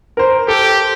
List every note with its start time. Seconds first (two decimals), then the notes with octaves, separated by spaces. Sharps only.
0.17 A#4 C5
0.48 G4 A4